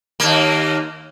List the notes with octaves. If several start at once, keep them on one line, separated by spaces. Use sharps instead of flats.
D#2 A#3